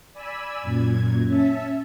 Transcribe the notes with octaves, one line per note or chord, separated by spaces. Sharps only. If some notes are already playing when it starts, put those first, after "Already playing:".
D5 G#5 B5 E6
F#2 A#2 G#6
C#4 E5 A5